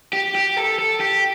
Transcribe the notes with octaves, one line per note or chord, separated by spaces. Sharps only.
G4
G4
A4
A4
G4